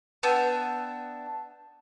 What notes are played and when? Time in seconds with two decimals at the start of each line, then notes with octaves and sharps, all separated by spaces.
0.23 B3 D4 E5 G5